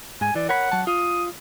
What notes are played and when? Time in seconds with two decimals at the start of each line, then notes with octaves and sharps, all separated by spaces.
0.21 G#2 G#5
0.35 E3 D5
0.49 A#4 C#5 F#5 B5
0.72 F#3 A5
0.87 F4 D#6